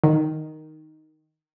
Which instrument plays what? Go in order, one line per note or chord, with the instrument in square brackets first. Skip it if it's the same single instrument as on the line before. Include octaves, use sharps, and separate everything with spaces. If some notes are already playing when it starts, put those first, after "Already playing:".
[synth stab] D#3